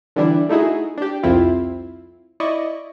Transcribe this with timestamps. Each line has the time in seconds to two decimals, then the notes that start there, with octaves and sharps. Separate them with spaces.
0.16 D3 E3 G3 D4 E4
0.49 A3 D#4 E4 F#4 G#4
0.97 D4 G4
1.23 C2 F2 C4 E4 F4
2.40 E4 D5 D#5 C#6